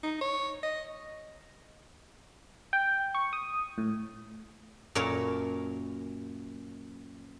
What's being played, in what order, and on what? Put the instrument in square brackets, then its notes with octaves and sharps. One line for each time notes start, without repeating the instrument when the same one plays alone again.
[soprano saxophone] D#4
C#5
D#5
[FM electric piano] G5
C#6
D#6
A2
[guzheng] F#2 A#2 A#4 C#5 A5